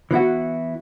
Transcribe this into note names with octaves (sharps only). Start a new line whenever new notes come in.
E3 B3 E4 F#4